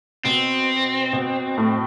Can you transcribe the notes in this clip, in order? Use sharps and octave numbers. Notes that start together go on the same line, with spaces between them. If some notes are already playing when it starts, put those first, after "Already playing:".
B2 B3 C4
B2 B3
A2 A3